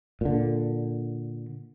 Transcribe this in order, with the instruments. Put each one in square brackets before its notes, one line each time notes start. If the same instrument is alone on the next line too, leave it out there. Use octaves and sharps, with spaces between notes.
[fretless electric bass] A#2 D3